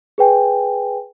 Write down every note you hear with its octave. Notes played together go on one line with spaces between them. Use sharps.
G#4 B4 G5 G#5